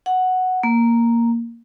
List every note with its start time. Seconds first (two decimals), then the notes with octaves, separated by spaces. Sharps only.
0.06 F#5
0.63 A#3